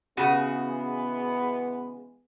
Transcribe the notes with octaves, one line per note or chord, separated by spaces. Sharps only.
C#3 E3 G#3 B3 F#4 G#4